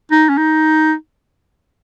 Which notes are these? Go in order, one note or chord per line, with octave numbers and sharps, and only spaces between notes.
D#4
C#4
D#4